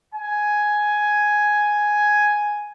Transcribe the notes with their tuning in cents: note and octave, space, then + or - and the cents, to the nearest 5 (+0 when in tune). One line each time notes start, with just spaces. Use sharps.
G#5 +5